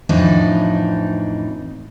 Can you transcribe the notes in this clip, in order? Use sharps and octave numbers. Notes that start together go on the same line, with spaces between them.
F2 A2 E3 D4 D#4